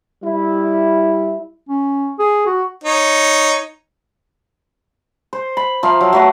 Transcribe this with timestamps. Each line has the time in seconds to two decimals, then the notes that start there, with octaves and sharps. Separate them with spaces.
0.23 G3 E4
1.69 C#4
2.19 G#4
2.46 F#4
2.84 D#4 C#5
5.33 C5
5.57 B5
5.83 F3 E5 F5 A#5
6.01 F#3
6.13 F#3 A3 B4